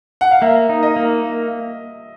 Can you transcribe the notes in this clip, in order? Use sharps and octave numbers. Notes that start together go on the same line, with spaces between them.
F#5
F5
A#3 E5
D#4
D#5
A#3